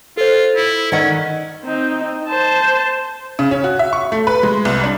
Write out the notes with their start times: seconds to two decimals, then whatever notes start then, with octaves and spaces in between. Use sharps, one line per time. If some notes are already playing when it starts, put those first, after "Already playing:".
0.17 F4 A4 C5
0.56 E4
0.92 D#3 C#4 D5 F#5
1.64 C4 D#4
2.28 C5 A5
3.39 C#3
3.51 C#4
3.64 F#4
3.79 E5
3.93 C#6
4.12 A3
4.27 B4
4.43 G#3
4.65 C2
4.84 D4